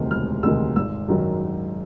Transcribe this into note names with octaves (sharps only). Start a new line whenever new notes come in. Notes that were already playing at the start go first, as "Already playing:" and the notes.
Already playing: E1 D2 C3 D#3 G#3 F6
E1 F6
D2 C3 D#3 G#3 E6
G#1 E6
F#2 D#3 F#3